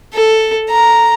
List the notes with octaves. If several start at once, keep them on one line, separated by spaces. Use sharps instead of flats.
A4
A#5